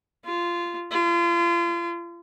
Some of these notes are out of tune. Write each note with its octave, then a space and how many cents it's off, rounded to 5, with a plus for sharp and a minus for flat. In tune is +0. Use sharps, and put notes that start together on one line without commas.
F4 -15
F4 -35